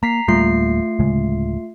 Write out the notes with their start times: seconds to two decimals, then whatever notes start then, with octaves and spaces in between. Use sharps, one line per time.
0.03 A#3 A#5 B6 C7
0.28 D1 G3 A3 A#3 F4 C7
0.99 D1 C#3 G#3